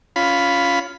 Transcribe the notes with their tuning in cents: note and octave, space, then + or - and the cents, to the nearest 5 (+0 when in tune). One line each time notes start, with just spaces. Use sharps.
C#4 +20 F4 +0 B5 +5